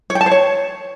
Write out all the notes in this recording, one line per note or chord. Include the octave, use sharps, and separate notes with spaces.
C#5
G5
A5
C5
C#5